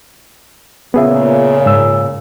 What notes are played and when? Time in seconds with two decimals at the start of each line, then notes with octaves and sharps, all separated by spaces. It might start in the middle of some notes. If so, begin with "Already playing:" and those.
0.94 A#2 C#3 B3 G#4 E5
1.66 G#2 E6